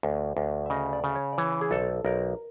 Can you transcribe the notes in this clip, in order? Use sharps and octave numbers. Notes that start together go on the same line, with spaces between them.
D2
D2
E5
C#3 D#5
D5
C#3
C#5
D5
E3 C#5
G#4
B1 A4
B1 A#4